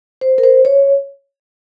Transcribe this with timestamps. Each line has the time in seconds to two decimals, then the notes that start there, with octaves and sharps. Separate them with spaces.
0.21 C5
0.38 A#4
0.43 C5
0.65 C#5